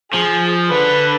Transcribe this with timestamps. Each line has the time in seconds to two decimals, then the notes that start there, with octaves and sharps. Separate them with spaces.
0.13 F3 G#4
0.70 D3 B4